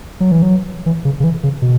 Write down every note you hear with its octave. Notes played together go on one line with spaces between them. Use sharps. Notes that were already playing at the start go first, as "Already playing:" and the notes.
F#3
E3
F#3
E3
C#3
C#3
E3
C#3
B2